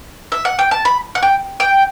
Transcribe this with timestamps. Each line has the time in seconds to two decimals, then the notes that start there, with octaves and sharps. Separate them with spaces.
0.32 E5
0.45 F#5
0.59 G5
0.71 A5
0.85 B5
1.15 F#5
1.23 G5
1.60 G5